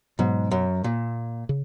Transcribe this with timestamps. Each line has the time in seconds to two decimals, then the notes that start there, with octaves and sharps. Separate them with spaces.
0.19 G#2 B2 F#3 B3
0.51 F#2
0.84 A#2
1.49 C#3